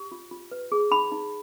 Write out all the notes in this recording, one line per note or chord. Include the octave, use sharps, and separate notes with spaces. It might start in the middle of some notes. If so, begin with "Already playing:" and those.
Already playing: G4
F4
F4
B4
G#4
D#4 B5
D#4